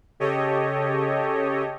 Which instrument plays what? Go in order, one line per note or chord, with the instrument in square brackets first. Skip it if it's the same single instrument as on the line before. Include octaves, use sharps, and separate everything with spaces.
[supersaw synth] C#3 G4 A4 C#5 D#5